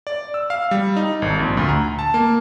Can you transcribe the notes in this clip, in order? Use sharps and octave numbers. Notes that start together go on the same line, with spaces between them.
D5
E6
F5
G3
D#4
G#1
A#1
D2
A#5
A5
A#3